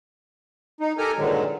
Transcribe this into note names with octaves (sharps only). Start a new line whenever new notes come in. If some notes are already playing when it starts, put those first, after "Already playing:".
D#4
G4 A4 A#4 G#5 A#5
G2 A#2 D3 D#3 F#3 G#3